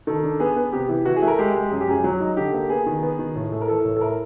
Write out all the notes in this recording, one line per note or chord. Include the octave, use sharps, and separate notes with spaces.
D#3 A4
D4
B3 G#4
B3
C3 G4
E3
E3 F#4
G#4
A3
A#4
G#3 G4
G#3
F#2 G#4
G4
F#2 G#4
F#3
D#4
D3 G4
A#3
B3 G#4
D#3
B3
D#3
A2
A3
A#4
E3 A4
A2
A4
E4 A#4